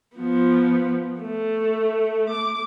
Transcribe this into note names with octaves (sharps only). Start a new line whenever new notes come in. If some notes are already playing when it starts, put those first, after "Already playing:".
F3 B3
A3
D6